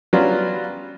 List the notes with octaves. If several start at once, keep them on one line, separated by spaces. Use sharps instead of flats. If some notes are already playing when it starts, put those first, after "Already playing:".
F#3 G3 B3 C#4 D4 F4